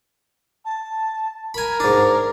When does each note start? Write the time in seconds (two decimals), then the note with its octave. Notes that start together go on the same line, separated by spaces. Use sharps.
0.64 A5
1.54 A#4 G#5 B5
1.80 G#2 D4